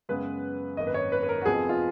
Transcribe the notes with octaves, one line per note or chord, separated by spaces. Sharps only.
F#2 C#3 G#3 B3 B4
G#1 F#2 D#3 A#3 D#5
B4
C#5
B4
B4
A#4
F#4
F1 F2 F3 B3 G#4
F4